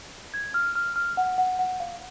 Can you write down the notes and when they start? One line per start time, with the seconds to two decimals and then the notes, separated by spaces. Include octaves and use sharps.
0.34 G#6
0.54 F6
0.75 F6
0.96 F6
1.17 F#5
1.38 F#5
1.59 F#5
1.80 F5